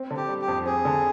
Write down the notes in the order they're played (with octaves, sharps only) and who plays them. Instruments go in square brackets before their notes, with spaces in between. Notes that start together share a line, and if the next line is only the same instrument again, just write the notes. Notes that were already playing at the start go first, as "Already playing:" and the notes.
Already playing: [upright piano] C4
D3
[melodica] G4
[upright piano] G3
[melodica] G4
[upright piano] F2
[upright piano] C4 [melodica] G#4
[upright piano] D3